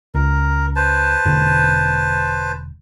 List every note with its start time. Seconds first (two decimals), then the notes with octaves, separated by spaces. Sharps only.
0.15 C#2 A#4
0.76 B4 C5 A5
1.25 E1 D3